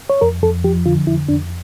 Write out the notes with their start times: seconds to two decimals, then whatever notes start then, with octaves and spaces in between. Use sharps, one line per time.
0.10 C#5
0.21 F2 A#4
0.43 F2 A4
0.64 F3 G4
0.86 D3 F4
1.07 F2 E4
1.28 F2 D4